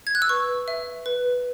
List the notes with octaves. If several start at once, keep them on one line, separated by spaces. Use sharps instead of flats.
G#6
F#6
E6
B4 C#6
E5
B4